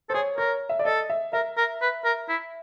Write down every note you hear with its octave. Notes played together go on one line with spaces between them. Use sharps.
A4 C5
G#4 C#5
A#4 C#5
E5
D5
A4 D#5
E5
A#4 E5
A#4
B4
A#4
E4